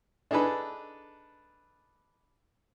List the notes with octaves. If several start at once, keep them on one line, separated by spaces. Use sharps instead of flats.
D4 D#4 G#4 A4 B4